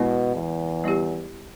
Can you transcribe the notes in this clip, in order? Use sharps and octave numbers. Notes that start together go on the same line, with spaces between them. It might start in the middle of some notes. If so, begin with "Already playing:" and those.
Already playing: B2 G#3 B3 E4
E2
G3 B3 E4 G4